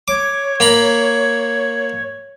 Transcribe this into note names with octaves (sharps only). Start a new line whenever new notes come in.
C#5 D6
A#3 A#5 B5